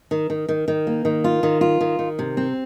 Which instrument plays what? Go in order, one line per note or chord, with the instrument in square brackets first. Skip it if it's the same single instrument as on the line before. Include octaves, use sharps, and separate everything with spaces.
[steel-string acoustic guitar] D#3
D#3
D#3
D#3
A#3
D#3
F4
D#3
F4
D#3
D#3
C3
C4